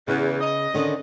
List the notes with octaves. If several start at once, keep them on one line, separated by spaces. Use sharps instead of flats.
E2 C#3
D#5
D3 D#3 C#4